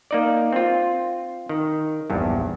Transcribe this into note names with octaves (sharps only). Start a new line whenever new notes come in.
A#3 D#4 D5
C4 F4
D#3
A#1 E2 G2